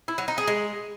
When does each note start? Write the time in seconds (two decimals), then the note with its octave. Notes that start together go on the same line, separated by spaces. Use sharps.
0.08 E4
0.18 F#3
0.28 D#4
0.38 G#4
0.48 G#3